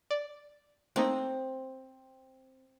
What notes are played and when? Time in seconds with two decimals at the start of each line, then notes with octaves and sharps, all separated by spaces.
0.11 D5
0.96 A3 A#3 C4 D#4 C5